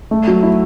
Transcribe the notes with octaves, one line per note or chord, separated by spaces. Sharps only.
A3
F#3
E4